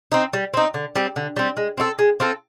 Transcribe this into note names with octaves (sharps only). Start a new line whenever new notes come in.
C4 D#4
G3
C4 D#4
D3
G3 C4
D3
G3 C4
G#3
C4 F4 A4
G#3
C4 F4 A4